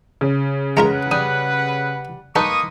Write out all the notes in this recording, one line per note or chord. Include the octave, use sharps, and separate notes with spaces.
C#3
G#3 F4 A#4 B4 F#5 A#5
G3 D#6
G#3 A#3 D#4 A4 B4 C#6 D#6